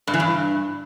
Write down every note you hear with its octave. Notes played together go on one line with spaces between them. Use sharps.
G2
E3
G2